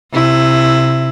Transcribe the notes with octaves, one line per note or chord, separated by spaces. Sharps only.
C3 E4